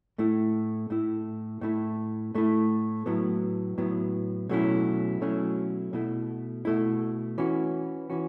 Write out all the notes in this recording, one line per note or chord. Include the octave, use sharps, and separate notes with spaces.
A2 A3 E4
A2 A3 E4
A2 A3 E4
A2 A3 E4
A2 F#3 B3 E4
A2 F#3 B3 E4
B2 F#3 A3 C#4 E4
B2 F#3 A3 C#4 E4
B2 A3 E4
B2 A3 E4
E3 C#4 F#4
E3 C#4 F#4